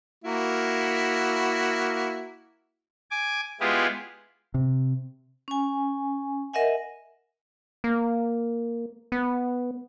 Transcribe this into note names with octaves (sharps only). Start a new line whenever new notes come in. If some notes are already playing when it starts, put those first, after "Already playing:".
A#3 E4 F#4
G#5 D6
G#3 B3 E4 F4 G4 G#4
C3
C#4 G#5
A#4 D#5 E5 F#5 G#5
A#3
B3